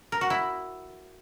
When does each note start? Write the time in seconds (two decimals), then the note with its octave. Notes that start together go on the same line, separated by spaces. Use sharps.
0.12 A#4
0.21 F#4
0.30 E4